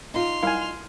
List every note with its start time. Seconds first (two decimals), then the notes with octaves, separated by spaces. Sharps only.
0.14 D#4 F4 C6 F7
0.43 G3 E4 A#4 F5 G#5